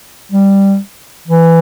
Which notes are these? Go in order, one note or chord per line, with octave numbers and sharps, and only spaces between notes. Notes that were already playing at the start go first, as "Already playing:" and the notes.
G3
E3